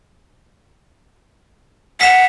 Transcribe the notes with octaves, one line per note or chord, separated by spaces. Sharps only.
F#5 B6 E7 F7